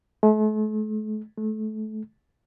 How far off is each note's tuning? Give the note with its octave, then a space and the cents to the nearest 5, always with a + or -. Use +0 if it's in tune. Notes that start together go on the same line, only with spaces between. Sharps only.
A3 -40
A3 -25